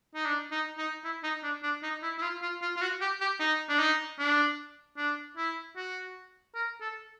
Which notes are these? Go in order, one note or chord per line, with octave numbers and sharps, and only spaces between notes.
D#4
D4
D#4
D#4
E4
D#4
D4
D4
D#4
E4
E4
F4
F4
F4
F4
F#4
G4
G4
D#4
D4
D#4
D4
D4
E4
F#4
A#4
A4